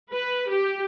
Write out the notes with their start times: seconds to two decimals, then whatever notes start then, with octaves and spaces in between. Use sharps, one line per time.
0.13 B4
0.50 G4